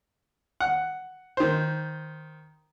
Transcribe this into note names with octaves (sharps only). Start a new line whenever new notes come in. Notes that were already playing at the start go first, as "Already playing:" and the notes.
F#5
D#3 C5